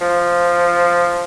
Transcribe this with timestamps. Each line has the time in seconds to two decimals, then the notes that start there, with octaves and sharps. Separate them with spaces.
0.01 F3